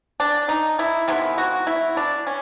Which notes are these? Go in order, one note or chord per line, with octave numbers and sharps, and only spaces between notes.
D4
D#4
E4
C3 D#3 G#3 B3 E4
F#4
E4
D4
C#4